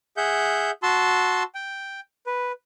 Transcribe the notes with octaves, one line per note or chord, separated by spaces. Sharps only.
G#4 E5 F#5 G6
F#4 A5 C6 E6
G5
B4